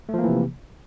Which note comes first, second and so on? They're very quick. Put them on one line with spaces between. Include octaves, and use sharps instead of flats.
A3 F3 A#3 E3 C3